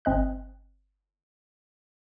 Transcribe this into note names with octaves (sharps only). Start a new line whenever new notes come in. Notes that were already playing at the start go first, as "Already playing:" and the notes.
G1 C4 D#5 F#6